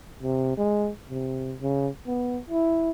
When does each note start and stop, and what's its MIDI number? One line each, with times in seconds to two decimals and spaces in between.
0.23 0.56 48
0.57 0.90 56
1.10 1.55 48
1.61 1.88 49
2.06 2.39 59
2.50 2.91 64